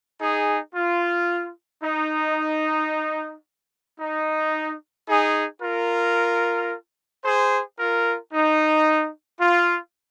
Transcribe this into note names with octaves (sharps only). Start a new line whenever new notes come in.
D#4 G#4
F4
D#4
D#4
D#4 G#4
F4 A#4
G#4 C5
F4 A#4
D#4
F4